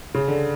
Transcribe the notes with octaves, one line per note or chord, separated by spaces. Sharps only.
C#3
D3